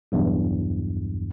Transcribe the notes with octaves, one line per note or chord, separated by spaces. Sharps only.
B1 E2 G2